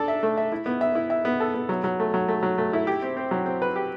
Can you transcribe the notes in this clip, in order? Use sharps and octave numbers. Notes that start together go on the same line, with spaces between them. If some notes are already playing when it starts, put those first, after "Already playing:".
Already playing: D4 A4
E5
A3
E5
E4
B3
E5
E4
E5
B3
A4
B3
F#3
F#3
A3
F#3
A3
F#3
A3
E4
G4
C4
C4
F#3
C4
B4
G4